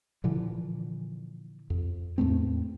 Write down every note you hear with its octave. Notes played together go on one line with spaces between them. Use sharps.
A#2 D3 E3 F3
F2
E2 A2 A3 C4